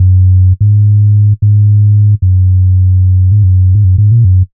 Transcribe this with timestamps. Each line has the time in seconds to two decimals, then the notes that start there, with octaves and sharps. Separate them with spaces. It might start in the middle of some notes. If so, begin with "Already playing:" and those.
Already playing: F#2
0.61 G#2
1.42 G#2
2.22 F#2
3.32 G#2
3.43 F#2
3.75 G#2
3.84 F#2
3.98 G#2
4.12 A#2
4.25 F#2